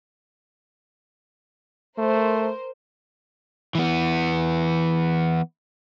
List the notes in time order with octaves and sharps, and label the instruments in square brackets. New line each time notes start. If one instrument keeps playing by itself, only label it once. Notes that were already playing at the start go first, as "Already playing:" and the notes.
[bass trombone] A3 [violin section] A#4 C5
[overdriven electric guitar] E3 B3